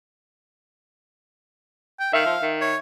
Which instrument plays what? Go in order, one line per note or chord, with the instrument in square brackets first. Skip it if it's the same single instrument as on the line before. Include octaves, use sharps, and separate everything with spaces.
[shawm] G5
[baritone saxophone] D#3 [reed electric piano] E5 [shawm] F5
[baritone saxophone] F3
D#3
[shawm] C#5